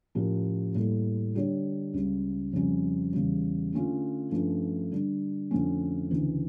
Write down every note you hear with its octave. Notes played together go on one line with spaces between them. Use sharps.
A2 F3 C#4 G4 A#4
A2 G3 A#3 E4 A4
D3 G3 D4 G4 C#5
C#2 C#3 G3
F2 C#3 G3 C#4
E2 C#3 G3
D3 A3 C#4 F4
G2 F3 A3 C#4
D3 G3 D4
F2 D3 F3 A3 C#4
D2 C#3 E3